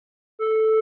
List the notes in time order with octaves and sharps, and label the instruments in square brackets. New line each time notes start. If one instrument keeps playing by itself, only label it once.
[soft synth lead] A4